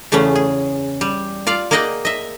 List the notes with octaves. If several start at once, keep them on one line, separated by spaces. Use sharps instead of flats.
E2 C#3 A3 B3 C#4
G#4
G3
F4 D5 F5
A#3 G#4 D5 D#5 F#5 G5
D#5 E5